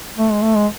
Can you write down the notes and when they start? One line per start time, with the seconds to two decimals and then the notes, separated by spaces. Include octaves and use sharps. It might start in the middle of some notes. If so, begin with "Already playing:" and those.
0.18 A3
0.32 G#3
0.42 A3
0.55 G#3